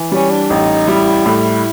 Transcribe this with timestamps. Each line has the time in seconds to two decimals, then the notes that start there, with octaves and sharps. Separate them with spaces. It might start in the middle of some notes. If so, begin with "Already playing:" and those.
Already playing: E3
0.12 G3 C#4
0.31 D4
0.50 A1 D#4
0.88 G3 E4
1.26 A2 E4